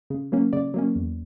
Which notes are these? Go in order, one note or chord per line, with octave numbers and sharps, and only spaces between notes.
C#3
F#3 A#3 C#4
C#3 D5
F#3 A#3 C#4
E2